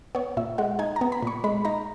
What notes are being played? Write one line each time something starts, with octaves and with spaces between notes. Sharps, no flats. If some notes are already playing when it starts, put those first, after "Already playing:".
B3 C#5
A#2 E5
G#3 F#5
D#4 G#5
A#5
B3
B5
A#2 C#6
G#3 B5
D#4 A#5